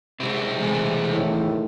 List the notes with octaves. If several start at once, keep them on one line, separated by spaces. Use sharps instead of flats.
C3 G#3 C4 E4
E2 G#3 A3 G#5
B1 A2 D#3 G#3